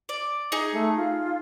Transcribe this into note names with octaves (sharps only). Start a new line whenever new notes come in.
D5
D#4 G#4
A3
F4